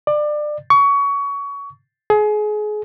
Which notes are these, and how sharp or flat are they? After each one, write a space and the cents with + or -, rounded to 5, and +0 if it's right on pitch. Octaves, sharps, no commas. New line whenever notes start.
D5 +25
C#6 +25
G#4 +30